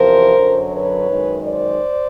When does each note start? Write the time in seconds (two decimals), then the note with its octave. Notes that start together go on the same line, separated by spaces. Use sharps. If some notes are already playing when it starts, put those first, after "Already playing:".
Already playing: E2 C3 F3 A#4 C5
0.36 F#2 D3 F#3
0.71 B4 C#5
1.08 F#2 D#3 G#3
1.44 C5 D5